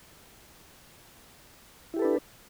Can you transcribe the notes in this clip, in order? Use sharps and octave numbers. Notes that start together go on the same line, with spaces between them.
D4 E4 G4 A4 B4